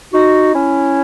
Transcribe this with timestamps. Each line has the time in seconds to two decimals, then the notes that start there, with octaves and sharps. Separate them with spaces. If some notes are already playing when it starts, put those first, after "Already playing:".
0.13 D#4 F#4
0.54 C#4 E4